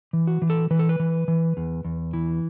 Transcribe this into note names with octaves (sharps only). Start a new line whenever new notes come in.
E3
F#4
E3
A4
E3 B4
A4
B4
E3
E3
E2
E2
E3